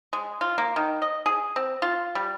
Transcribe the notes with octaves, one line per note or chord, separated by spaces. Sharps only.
G#3
F4
A#3
D#3
D#5
G#4
C4
F4
G3